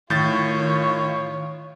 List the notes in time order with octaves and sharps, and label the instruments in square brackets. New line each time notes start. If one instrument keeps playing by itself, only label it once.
[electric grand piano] A2 G6 A6 [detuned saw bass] D#3 [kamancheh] F4 C#5